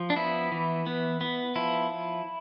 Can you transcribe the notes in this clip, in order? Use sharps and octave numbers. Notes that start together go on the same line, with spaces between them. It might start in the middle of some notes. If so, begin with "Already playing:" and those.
Already playing: F3
D4
B3 E4
E3
B3
B3
F3 E4